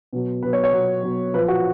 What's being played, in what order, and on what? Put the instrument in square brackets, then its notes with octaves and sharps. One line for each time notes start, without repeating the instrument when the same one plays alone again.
[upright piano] B2 F#3
B2 F#3 B4
C#5
C#5
B2 F#3
B2 F#3
A#2 F3 B4
F#4